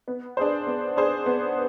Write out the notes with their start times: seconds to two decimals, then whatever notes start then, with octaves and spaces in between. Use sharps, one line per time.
0.08 B3
0.37 D4 G#4 C5
0.67 B3
0.96 D4 G#4 C5
1.26 B3